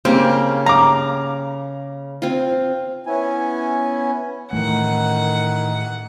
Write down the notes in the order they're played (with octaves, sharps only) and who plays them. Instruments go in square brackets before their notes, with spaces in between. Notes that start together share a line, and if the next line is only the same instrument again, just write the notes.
[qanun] C#3 A#3 G4 [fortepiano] C4
[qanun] F5 [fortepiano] A#5 D6
[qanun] C4 F4
[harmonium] B3 C#4 E4 G#5
[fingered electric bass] A2 E3 A3 [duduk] D#3 [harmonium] D#4 [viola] F#5